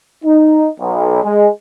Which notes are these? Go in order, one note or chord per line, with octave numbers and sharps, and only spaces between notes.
D#4
B1
G#3